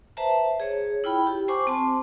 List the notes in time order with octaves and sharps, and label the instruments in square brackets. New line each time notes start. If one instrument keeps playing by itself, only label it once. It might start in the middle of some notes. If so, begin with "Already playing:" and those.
[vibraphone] B4 C5 E5 A5 A#5
G#4 C#5
E4 F4 G5 B5
G4
C5 G#5 C#6 D6
C4 A5 C6